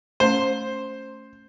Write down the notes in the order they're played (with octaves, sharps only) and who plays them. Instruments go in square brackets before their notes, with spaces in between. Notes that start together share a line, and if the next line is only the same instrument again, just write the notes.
[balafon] A3 C#4 [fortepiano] C5